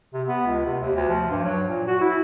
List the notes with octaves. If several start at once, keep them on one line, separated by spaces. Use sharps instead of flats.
C3
B3
C#2
C3
D#2
D2
F3
G2
F#3
A#2
F#4
E4